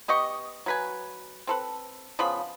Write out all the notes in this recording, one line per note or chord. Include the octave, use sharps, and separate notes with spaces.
B3 G4 D#5 C#6
F#3 B4 G#5
C4 A4 B4
C#3 F3 B3 B5